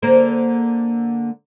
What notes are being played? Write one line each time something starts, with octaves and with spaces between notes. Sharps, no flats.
D3 A#3 C5